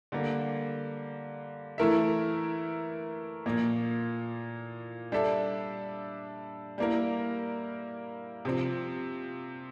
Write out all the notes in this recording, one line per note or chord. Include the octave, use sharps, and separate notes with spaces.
D3 G3 A#3
E3 A3 E4 A#4 E5
A#2 F3 A#3
G3 D4 A4 E5
G3 A#3 E4 A#4
C3 F3 C4